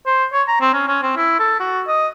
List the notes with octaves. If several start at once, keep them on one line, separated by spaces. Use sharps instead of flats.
C5
C#5
A#5
C4
C#4
C#4
C4
E4
A4
F#4
D#5